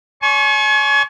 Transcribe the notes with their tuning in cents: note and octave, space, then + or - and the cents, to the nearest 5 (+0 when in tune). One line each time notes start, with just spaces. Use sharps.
C#5 +40 G#5 +35 C#6 -30